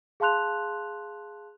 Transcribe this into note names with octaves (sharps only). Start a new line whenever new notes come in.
G#4 F5 A5 C6 F#6 F7